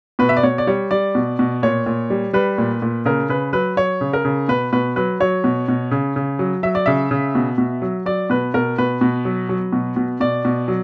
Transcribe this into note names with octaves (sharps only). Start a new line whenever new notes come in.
B2 B4
E5
D5
B2 C#5
D5
G3 C#5
G3 D5
B2
B2
A#2 C#5
A#2
G3
G3 B4
A#2
A#2
C#3 A#4
C#3 B4
F#3 B4
F#3 C#5
C#3
A#4
C#3
B2 B4
B2 B4
F#3 B4
F#3 C#5
B2
B2
C#3
C#3
F#3
F#3 E5
D5
C#3 E5
C#3
B2
B2
F#3
F#3 D5
B2 B4
B2 A#4
B2 B4
B2
F#3
F#3
B2
B2
B2 D5
B2
F#3